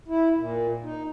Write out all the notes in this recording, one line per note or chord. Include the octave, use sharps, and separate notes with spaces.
E4
A#2
D#4